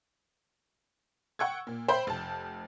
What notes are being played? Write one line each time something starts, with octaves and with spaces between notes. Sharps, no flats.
F#5 G5 C#6 E6 G#6
A#2
C5 E5 G5 B5 C6 G6
F1 A5